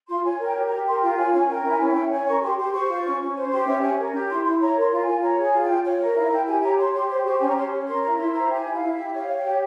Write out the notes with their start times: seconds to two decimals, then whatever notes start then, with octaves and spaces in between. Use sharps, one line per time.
0.09 F4 C6
0.24 C#5 G#5
0.40 A#4
0.45 G5
0.56 G4
0.66 A#5
0.71 G4
0.87 A#4 C6
1.02 F4 G5
1.18 C#5 G#5
1.33 C#4 G#5
1.49 A#4 G5
1.65 E4
1.70 G#5
1.81 C#4
1.91 G5
1.96 C#4
2.12 C#5 G#5
2.27 A#4 C#6
2.43 G4 C6
2.58 G4 C6
2.74 C5 C#6
2.89 F4
3.05 C#4
3.21 C#4
3.36 C5
3.52 G4 C6
3.67 C#4 E5
3.82 C#4 G#5
3.99 A#4
4.14 G4
4.29 E4 C6
4.45 E4 C6
4.61 C#5 A#5
4.76 A#4
4.81 C6
4.92 F4
5.02 G#5
5.07 F4
5.22 C#5 A#5
5.38 G#4
5.43 G#5
5.54 F4
5.64 G5
5.70 F4
5.85 C#5
6.01 A#4 E5
6.16 E4 F5
6.31 E4 G5
6.47 G4 G#5
6.63 C#5 A#5
6.78 C#5 C6
6.94 G4 C6
7.10 C5 C6
7.25 G4 C#6
7.40 C#4 G#5
7.48 A#5
7.56 C#4 C6
7.72 C#5
7.87 A#4 C6
8.03 E4 A#5
8.18 E4 C6
8.34 C5 A#5
8.49 G4
8.55 G#5
8.65 E4
8.75 F5
8.81 E4
8.96 G4 E5
9.12 C#5 F5
9.27 C#5
9.37 G5
9.43 G4